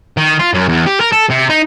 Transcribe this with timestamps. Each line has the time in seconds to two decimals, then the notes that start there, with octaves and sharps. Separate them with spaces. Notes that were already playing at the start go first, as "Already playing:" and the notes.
0.17 D#3
0.39 F4
0.54 F#2
0.68 E2
0.86 G4
1.01 A#4
1.12 A4
1.30 C3
1.50 D#4